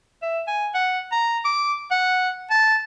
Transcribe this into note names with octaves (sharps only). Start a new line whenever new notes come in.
E5
G#5
F#5
A#5
D6
F#5
A5